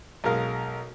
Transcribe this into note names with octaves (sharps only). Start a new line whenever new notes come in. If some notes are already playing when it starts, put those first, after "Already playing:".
B1 G#3 A#4 F5